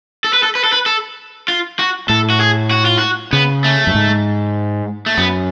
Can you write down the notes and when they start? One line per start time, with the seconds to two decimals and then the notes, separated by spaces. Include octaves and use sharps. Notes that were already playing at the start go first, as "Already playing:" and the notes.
0.24 A4
0.33 B4
0.43 A4
0.55 B4
0.64 A4
0.73 B4
0.86 A4
1.48 F4
1.79 F#4
2.09 A2 A4
2.30 F#4
2.40 G#4
2.71 F#4
2.85 F4
2.99 F#4
3.33 C#3 B3
3.64 A3
3.87 F#2
3.95 G#2
5.06 A3
5.17 F#2 B3